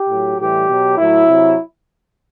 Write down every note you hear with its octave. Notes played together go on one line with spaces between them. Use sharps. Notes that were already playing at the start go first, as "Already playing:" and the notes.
Already playing: G4
A2 F#3
A2 E3 G3 G4
B2 F#3
A2 F#3 E4
C3 F#3